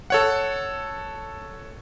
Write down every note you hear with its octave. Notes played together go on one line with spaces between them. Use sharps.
A4 C#5 F#5